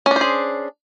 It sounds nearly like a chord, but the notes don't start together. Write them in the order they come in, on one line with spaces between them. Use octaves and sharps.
C#4 D4 C5 G#4